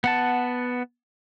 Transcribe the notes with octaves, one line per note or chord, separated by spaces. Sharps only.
B3 F#5 A5